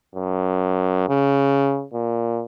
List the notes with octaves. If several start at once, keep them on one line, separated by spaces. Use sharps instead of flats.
F#2
C#3
A#2